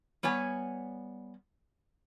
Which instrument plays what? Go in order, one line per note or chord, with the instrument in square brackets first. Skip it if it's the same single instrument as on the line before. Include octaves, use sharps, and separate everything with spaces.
[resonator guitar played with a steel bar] G3 B3 C#5 G#5